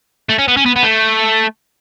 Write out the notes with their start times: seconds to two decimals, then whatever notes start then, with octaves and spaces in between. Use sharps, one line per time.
0.29 A3
0.39 C#4
0.48 B3
0.57 C#4
0.66 B3
0.76 B3
0.84 A3